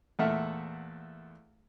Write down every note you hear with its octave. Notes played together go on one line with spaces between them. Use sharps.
E2 A#2 A3 E5 F#5 F6